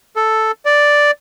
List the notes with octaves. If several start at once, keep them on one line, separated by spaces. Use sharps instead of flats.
A4
D5